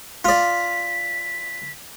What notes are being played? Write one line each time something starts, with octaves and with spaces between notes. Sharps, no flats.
F4 D5 B6